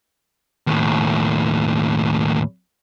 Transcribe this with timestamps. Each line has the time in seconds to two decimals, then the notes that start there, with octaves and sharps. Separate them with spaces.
0.67 D#2 A2